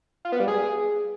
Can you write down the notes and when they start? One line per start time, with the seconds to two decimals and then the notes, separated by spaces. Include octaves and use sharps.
0.25 F4
0.32 B3
0.40 G3
0.48 G#4